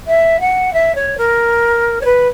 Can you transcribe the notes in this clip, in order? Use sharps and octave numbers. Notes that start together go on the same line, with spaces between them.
E5
F#5
E5
C#5
A#4
C#5
B4